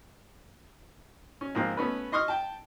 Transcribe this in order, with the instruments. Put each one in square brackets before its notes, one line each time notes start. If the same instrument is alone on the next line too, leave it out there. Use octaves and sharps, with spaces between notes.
[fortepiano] C#4
G#2 F3 A#3 C4 F4
A3 B3 C#4 B4
D#5 C6 C#6 D#6 F6
G5 A5